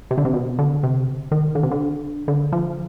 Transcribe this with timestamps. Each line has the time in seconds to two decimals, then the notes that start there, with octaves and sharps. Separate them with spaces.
0.11 C3
0.18 D3
0.25 C3
0.34 B2
0.59 D3
0.83 C3
1.31 D#3
1.55 D3
1.63 C3
1.71 D3
2.28 D3
2.52 F3